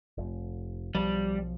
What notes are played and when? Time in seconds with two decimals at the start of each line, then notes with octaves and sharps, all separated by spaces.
0.18 F1
0.95 B1 F3 G3